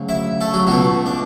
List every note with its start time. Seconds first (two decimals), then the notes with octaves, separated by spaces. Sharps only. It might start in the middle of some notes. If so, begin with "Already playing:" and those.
Already playing: D2 C#3 F#3
0.09 E4 E5
0.41 A3 A4
0.54 F#3 F#4
0.67 C#2 B2 F#3 A3 F#4
1.06 D4